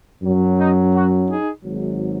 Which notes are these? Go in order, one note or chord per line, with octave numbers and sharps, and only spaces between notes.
F#2 F#3 C#4
D#4
F#4
D#4 G#4
G#1 G#2 F#3